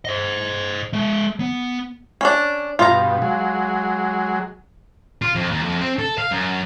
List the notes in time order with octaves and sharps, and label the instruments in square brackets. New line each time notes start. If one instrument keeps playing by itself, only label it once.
[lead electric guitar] C5 D#5
G#3 E5
B3
[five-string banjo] C#4 D4
[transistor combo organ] G2 B2 [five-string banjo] F4 A#5
[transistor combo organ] F#3 G#3
[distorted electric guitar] F4
F2
D#2
F2
C4
A4
F5
F#2